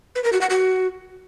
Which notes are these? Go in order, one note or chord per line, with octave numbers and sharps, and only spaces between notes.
B4
A#4
F#4
F#5
F#4